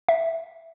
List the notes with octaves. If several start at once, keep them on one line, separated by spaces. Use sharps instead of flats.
E5